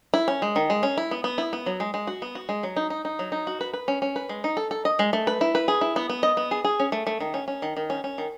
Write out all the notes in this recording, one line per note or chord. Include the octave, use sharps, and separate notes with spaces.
E4
C#4
G#3
D#3
G#3
C#4
E4
B3
B3
E4
B3
F#3
G#3
G#3
F#4
B3
F#4
G#3
F#3
D#4
D#4
D#4
F#3
D#4
F#4
B4
B4
C#4
C#4
B4
G#3
D#4
A4
A4
D#5
G#3
A3
B4
E4
B4
G#4
E4
B3
B3
D#5
B3
G#4
G#4
C#4
A3
A3
D#3
C#4
C#4
D#3
D#3
C#4
C#4
D#3